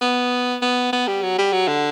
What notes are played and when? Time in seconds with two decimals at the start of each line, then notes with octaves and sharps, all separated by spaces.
0.01 B3
0.62 B3
0.93 B3
1.07 G3
1.22 F#3
1.38 G3
1.52 F#3
1.68 D3